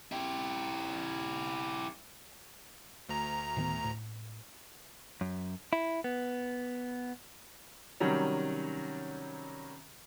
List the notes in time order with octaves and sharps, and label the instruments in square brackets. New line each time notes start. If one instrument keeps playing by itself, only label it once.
[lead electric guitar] E4 G4
[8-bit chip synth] D2 A#5
[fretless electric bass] A2 D#3 B3
A2
[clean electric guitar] F#2
E4
B3
[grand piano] C3 D#3 F#3 G3 C#4